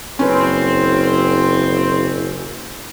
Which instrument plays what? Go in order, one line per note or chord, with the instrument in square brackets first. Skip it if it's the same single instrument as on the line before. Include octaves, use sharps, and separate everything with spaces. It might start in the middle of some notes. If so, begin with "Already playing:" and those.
[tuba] F#1 [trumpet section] C4 [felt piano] C#4 B4